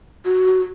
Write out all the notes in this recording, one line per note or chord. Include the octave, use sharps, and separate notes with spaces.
F#4